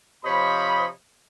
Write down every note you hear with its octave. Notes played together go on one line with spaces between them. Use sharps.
C3 F3 C#5 D#5 B5